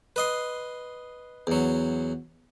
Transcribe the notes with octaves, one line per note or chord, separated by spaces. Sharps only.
B4 D#5 C6
E2 F#3